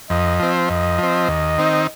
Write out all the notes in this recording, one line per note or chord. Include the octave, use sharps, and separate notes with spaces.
F2 D#5
F3 C4
F2 D#5
F3 C4
D#2
D#3 C4 D#4